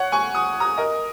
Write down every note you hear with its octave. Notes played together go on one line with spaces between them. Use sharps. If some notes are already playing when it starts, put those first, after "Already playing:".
Already playing: C#5 F#5
G#5 C#6
D#6
A#5 D#6
A#4 D#5